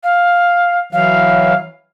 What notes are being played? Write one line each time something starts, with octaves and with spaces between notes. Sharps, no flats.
F5
E3 F#3 F5